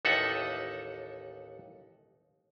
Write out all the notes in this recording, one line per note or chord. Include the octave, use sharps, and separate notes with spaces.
A1 D#2 D#4 A4 E5 F#5